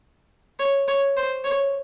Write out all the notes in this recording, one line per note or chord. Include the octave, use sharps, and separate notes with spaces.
C#5
C#5
C5
C#5